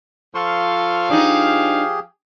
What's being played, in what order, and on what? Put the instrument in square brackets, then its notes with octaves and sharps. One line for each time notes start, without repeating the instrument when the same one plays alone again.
[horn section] F3 F5 [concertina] A4 C6 C#6
[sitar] D4 D#4 [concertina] G4 G#4